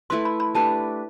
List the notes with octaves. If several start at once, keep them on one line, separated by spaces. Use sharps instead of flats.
A3 E4 B4 C6
B5
B5
A3 D4 G4 B4 A5